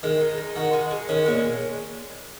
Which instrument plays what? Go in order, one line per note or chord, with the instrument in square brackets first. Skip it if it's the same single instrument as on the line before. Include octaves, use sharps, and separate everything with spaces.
[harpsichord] D#3 [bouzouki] G#3
[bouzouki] D#4
D#4
[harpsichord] D#3 [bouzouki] F#4
[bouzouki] G#3
G#3
[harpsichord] D#3 [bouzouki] C#4
[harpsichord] A#2 [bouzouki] G#3